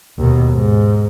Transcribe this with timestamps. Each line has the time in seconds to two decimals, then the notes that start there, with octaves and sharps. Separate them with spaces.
0.19 D#2 B2
0.52 G#2